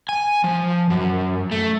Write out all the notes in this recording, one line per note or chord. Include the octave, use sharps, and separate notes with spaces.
G#5
F3
F#2
A3